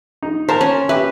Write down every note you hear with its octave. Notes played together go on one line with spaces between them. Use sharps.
D#4
A#4 C5 A5
C#4
G4 B4 E5